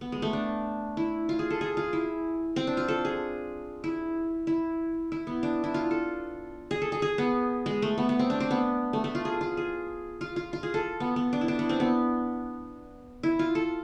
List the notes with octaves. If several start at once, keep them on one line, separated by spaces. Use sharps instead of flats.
B3
G#3
A3
D4
E4
F4
G#4
A4
G#4
F4
E4
C4
D4
F4
A4
G#4
E4
E4
E4
B3
D4
E4
F4
A4
G#4
A4
G#4
G#4
B3
G#3
A3
B3
B3
C4
D4
C4
B3
A3
A3
F4
G#4
F4
G#4
F4
F4
F4
G#4
A4
B3
B3
D4
E4
D4
B3
C4
B3
E4
F4
A4